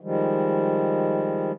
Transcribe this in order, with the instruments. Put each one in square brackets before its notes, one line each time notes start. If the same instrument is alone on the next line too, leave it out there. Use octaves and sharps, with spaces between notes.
[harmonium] D#3 F3 G3 G#3